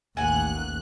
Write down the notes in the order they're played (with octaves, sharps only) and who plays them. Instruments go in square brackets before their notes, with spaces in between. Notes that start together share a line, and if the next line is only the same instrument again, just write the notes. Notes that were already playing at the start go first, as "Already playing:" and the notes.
[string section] A1 F#6 [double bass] D#2 [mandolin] F#5 G#5